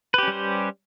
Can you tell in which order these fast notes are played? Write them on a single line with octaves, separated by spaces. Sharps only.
B4 G4 C#4 G3 C5